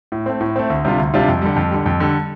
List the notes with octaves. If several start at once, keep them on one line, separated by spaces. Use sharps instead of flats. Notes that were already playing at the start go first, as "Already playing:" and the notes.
A2
A3 C4
A2
A3 C4
D2
C3 G3 D4 F4
D2
C3 G3 D4 F4
F2
D3 G3
F2
D3 G3
F2
D3 G3